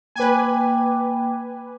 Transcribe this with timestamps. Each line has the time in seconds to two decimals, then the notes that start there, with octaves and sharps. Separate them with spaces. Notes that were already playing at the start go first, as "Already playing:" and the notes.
0.16 A#3 B4 G5 G#5 D6